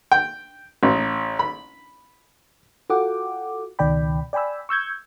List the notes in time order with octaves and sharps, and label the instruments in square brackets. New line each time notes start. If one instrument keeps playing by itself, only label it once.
[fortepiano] G5
A1
B5
[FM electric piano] F4 F#4 A4 F#5 G5 D6
C#2 B2 D#3 D5 G5 B5
D5 G5 G#5 B5 E6
C#6 E6 G6 G#6